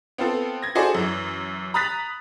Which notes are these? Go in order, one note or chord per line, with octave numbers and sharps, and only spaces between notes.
B3 C4 F4 A4
G#6 A#6
F#4 G#4 A4 C5 D5
F#2 E3
A#5 B5 D#6 F#6 A6 B6